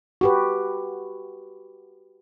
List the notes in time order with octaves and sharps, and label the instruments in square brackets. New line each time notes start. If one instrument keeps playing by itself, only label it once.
[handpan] F#4 G4 B4